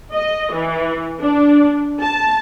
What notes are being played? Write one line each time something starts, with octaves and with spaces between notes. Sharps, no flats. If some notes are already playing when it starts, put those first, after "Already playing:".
D#5
E3
D4
A5